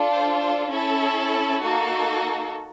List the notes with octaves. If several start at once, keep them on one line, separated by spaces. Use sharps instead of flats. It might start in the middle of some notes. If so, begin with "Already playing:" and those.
Already playing: D4 F4 A4
C5
C5
C#4 E4 A4
A#3 D#4 F#4 A4